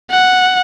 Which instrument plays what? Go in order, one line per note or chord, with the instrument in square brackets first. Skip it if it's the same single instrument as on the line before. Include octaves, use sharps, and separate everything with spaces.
[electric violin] F#5